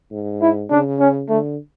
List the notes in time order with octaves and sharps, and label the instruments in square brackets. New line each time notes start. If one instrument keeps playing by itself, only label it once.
[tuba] G#2
[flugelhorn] E4
[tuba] C#3 [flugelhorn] D4
[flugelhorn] C#4
[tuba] D3 [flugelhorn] A3